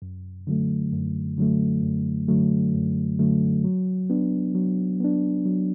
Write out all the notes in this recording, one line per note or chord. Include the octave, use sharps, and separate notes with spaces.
F#2
D3 F#3 A3
F#2
D3 F#3 A3
F#2
D3 F#3 A3
F#2
D3 F#3 A3
F#3
B3 D4
F#3
B3 D4
F#3